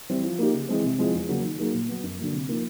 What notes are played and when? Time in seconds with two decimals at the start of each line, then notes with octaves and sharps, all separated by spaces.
0.09 E3 G3 C4 E4
0.24 F3
0.39 A#3 D#4 G4
0.54 C#3
0.69 E3 G#3 C4
0.84 C3
0.98 F3 G#3 C4 E4
1.14 E2
1.29 C#3 F#3 A#3
1.44 D#3
1.58 F#3 A#3 D#4 G#4
1.73 A#2
1.88 F#3 B3
2.03 F#2
2.18 D3 F#3 A#3
2.33 C3
2.48 F3 A#3 D#4